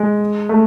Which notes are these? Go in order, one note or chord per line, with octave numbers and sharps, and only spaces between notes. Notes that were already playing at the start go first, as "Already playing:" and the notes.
Already playing: G#3
A3